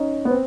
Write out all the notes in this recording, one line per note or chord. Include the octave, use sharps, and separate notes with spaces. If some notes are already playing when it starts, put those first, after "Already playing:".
Already playing: C#4 D#4
B3
C4